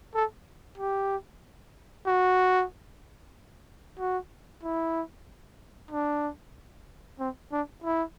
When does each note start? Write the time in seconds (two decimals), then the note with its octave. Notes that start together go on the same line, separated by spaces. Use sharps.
0.15 A4
0.78 G4
2.07 F#4
3.99 F#4
4.63 E4
5.91 D4
7.19 C4
7.52 D4
7.84 E4